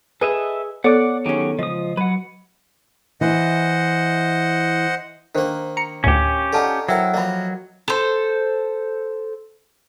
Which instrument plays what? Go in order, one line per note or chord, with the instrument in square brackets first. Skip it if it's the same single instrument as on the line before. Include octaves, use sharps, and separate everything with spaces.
[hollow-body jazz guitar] G#4 [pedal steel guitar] A4 D#5 E5 [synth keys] B4
[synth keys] B3 A4 C#5 [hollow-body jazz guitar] D5 [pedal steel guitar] F#5 D6 F#6
[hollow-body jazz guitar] D#3 C#4 [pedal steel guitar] F#3 G4 G#4
[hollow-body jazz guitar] C#2 [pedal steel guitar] F3 D#6 [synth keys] D#5
[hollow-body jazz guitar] F#3 [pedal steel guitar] B4 F#5
[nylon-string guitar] E3 [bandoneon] C5 D#5 F#5
[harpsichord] D#3 A#3 [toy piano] D4 C5
[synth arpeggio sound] A#5 C#7
[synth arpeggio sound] D2 A2 [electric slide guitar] C#4 G4 [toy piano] F5
[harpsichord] D#4 F4 D5 [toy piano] A4 F#5 A5
[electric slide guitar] F#3 [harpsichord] E4 A#4 [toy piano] C5 G5
[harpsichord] F3 A#3 [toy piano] D#5 E5 B5
[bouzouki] A4 C5